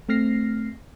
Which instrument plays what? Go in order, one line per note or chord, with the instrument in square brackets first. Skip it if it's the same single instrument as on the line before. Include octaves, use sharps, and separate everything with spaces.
[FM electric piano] A3 C4 F6 A#6 C7